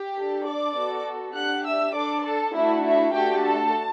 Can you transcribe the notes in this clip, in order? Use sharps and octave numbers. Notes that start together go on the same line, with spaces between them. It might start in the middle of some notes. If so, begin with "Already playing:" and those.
Already playing: G4 G5
D4 A4
D5 D6
B3 F#4 A4
D4 G4 F#5 F#6
E5 E6
D4 A4 D5 D6
A4 A5
A3 D4 E4 F#4 A4 E5
E4 E5
A3 D4 F#4 G4 A4 G5
A4 A5